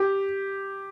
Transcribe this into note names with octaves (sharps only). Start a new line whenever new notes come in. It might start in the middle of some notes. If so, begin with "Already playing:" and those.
Already playing: G4